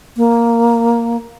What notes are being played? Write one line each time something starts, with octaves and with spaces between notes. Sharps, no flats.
A#3